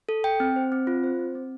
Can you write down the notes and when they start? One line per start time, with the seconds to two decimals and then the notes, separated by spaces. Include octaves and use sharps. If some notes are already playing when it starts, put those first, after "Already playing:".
0.09 A4
0.24 G5
0.40 C4
0.56 C5
0.72 C4
0.87 F4
1.03 C5
1.19 C4
1.35 C4